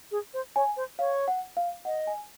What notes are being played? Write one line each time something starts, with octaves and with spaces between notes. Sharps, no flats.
G#4
C5
C#5 G#5
C5
C#5 F5
F#5
F5
D#5 F#5
G#5